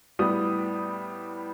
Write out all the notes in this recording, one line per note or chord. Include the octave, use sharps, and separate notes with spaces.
A2 G3 B3 D#6